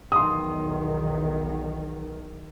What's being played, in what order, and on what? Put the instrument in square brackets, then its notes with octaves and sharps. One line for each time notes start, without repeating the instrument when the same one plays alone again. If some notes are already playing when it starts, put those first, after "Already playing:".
[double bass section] B1 E2 D#3 [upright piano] C6 D#6